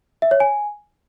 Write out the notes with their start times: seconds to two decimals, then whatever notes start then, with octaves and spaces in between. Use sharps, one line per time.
0.22 E5
0.31 C#5
0.40 G#5